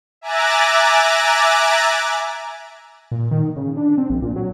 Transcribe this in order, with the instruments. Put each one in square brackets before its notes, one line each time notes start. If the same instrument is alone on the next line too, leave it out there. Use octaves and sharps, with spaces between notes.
[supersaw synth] E5 G#5 A#5 D6 F#6 A6
[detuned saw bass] A#2
D#3
C#3
D4
C4
A#1
A#2
F#3